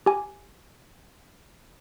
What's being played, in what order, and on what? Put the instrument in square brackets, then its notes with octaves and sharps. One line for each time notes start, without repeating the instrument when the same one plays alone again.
[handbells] G4 G#5